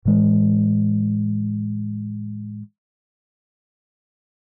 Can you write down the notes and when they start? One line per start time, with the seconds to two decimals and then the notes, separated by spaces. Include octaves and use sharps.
0.05 A2 E3 G#3